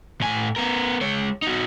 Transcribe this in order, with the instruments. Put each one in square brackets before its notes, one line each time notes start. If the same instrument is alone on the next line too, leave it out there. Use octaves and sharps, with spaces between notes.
[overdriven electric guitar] A2 G#5
B3 A#4
G#3 C#5
D#4 F#4